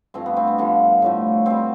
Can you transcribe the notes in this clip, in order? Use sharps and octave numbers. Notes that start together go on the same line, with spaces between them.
G2 F3 A3 C4
B3
C4
B3
G2 D3 F3
A2 F3 A3
B2 G3 C4